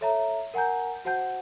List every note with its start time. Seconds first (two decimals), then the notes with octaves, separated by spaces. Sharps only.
0.01 A4 C#5 E5 A5 A#5
0.54 A#4 F#5 G#5 A#5 G6
1.05 F#4 C5 F#5 A5 G6